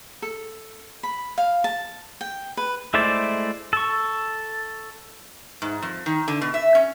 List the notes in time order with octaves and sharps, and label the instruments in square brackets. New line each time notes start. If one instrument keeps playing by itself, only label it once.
[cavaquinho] A4
B5
F5
A5
G5
B4
[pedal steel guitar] G#3 A3 E4 C5 D5
A4 C#6
[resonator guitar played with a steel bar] G#2
F2
D#3
D3
B2
E5
C#4